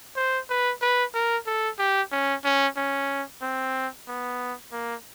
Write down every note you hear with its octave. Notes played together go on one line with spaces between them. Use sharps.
C5
B4
B4
A#4
A4
G4
C#4
C#4
C#4
C4
B3
A#3